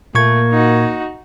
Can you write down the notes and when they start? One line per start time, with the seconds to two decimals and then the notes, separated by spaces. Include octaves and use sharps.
0.15 A#2 A3 A#3 C#6 G#6
0.51 D#4 F#4